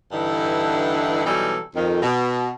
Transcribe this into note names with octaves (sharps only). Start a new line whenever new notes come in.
G2 D3 E3 D#4 E4
B2 E3 F#3 G3 D#4 A4
F2 D#3
B2